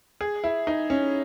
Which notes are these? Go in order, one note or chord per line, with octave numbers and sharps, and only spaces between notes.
G#4
E4
D#4
C#4